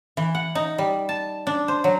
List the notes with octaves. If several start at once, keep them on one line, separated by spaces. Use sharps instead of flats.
E3
F#5
D#4
G3
A5
D4
C5
F#3